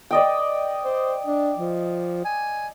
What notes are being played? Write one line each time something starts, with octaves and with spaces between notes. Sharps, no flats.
D5 D#5 G5
C5
D4
F3
G#5